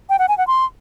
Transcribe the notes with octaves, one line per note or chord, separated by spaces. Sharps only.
G5
F#5
G#5
F#5
C6